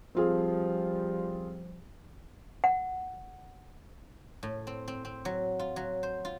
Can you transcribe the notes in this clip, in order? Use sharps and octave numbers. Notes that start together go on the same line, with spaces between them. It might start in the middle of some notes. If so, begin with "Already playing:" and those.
F3 G3 C4 F4 G#4
F#5
A2
C4
C4
C4
F#3
F4
F#3
C5
F4